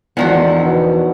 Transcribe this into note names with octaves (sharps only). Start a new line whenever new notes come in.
E2 D3 D#3 F3 F#4 F#5
B2